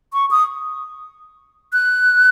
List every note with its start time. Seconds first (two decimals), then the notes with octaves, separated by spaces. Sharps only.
0.13 C#6
0.31 D#6
1.73 F#6